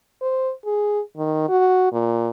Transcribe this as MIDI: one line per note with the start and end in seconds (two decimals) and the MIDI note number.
0.22 0.52 72
0.65 1.00 68
1.17 1.48 51
1.49 1.88 66
1.93 2.31 46